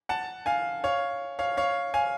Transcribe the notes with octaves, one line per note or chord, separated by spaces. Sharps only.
F#5 A5
F5 G#5
C#5 F5
C#5 F5
C#5 F5
F5 G#5